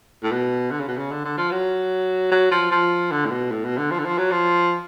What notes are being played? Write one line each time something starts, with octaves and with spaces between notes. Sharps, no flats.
A2
B2
D3
C#3
B2
C#3
D3
D3
F3
F#3
F#3
F3
F3
D3
A2
B2
A2
B2
D3
F3
D3
F3
F#3
F3